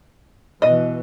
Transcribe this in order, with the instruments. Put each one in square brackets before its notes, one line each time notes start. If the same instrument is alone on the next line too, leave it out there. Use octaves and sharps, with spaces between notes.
[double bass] B2 E3 [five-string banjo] D#5